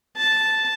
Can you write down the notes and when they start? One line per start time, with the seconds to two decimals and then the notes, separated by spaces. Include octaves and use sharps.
0.16 A5